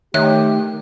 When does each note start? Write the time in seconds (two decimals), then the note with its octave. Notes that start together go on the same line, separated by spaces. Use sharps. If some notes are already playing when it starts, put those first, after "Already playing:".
0.14 D#3 A3 G4 C#5 E5 F#6